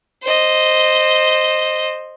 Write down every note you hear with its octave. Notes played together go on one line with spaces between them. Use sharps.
C5 D#5